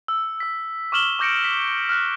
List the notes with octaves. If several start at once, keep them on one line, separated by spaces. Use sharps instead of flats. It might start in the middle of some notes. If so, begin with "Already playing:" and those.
E6
E6 B6
C#6 D6 F6 E7 F#7 G7
C#6 D6 G6 A#6 C#7 D7
B6
F6 F#6